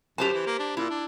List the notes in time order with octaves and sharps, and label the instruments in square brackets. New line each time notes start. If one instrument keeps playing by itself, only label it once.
[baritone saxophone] F#2 [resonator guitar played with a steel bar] G4 C5 A5
[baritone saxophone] E3
A#3
D4
[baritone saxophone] A#2 [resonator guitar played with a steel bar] E4
[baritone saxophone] D4